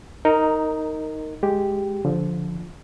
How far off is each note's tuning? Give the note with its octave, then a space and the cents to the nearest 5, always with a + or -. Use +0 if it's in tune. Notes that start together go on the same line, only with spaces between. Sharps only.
D#4 +5 A#4 -15
G#3 +0 G4 +0
D3 -25 F3 -5